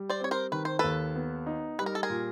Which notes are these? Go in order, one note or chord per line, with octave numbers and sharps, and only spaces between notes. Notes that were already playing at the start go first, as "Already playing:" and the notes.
Already playing: G3
C5 D5
C4 C#5
A#4 C5
D#3 B4
C5
D#2 A4 B4
B3
D#4
G3 B4
A#4
A4
G#4 A#4
A#2